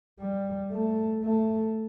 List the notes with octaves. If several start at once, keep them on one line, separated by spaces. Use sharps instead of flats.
G3
A3
A3